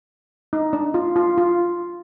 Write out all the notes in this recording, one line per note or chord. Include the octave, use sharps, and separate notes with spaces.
D#4
D4
F4
F4
F4